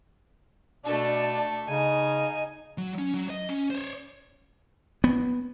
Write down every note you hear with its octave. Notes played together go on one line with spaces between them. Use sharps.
B2 A3 D4 A4
C#3 D#4 G#5
F#3
C#4
F#3
D#5
C#4
C5 C#5
B3